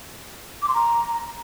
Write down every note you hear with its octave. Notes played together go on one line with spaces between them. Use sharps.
D6
C6
A#5